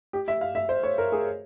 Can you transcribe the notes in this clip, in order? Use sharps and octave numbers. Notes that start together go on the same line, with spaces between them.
G4
E5
F5
E5
C5
C#5
A#4
G#4